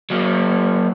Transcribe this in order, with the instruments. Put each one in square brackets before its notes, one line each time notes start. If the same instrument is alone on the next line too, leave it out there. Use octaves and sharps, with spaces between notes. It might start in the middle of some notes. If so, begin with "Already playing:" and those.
[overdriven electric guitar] F#3 A#3